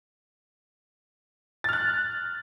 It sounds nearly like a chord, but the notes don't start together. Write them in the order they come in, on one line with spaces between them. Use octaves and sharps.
A6 F6 F#6